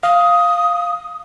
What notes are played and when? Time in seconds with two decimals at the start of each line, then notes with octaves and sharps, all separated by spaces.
0.03 F5 D#6